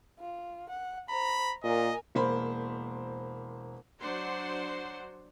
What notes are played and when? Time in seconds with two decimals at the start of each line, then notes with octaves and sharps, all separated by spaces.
0.19 F4
0.69 F#5
1.09 C5 A#5 B5
1.63 A#2 A#4 D#5 G#5
2.15 E1 A#3 C5 B5
4.00 F#3 D4 C5 F#5 C6